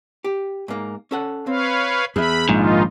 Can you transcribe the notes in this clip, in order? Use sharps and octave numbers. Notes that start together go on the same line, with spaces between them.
G4
G#2 A#3
C#4 A4 F#5
C4 B4 C#5 F5
E2 G#4 E5 B5
A#1 G#2 D#3 D#4 F4